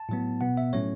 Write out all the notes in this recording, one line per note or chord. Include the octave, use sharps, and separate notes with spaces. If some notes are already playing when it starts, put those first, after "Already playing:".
Already playing: A5
A2 F#3 B3
B2 B3 F#5
E5
A2 F#3 A3 C#4 C#5